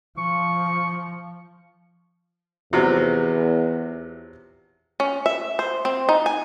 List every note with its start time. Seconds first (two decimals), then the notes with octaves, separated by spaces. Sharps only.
0.18 F3 C#6
2.73 E2 C3 F3 F#3
5.00 C#4
5.26 E5
5.59 C5
5.85 C4
6.09 D#4
6.26 G#5